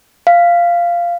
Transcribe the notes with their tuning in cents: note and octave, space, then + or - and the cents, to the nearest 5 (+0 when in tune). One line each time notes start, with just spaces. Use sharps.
F5 -10